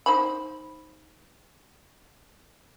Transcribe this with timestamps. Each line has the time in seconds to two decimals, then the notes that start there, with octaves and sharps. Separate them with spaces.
0.06 D#4 C5 B5